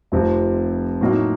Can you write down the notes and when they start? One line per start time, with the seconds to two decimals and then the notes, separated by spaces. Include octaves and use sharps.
0.12 F1 F2 C3 F3
1.01 A2 F#3 A#3 D#4